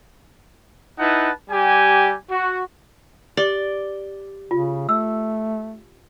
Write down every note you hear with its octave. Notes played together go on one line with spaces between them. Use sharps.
D#4 E4 B4 F#5 A5
G3 G4 G#5
F#4
G4 D5 G7
C#3 F4
A3 E6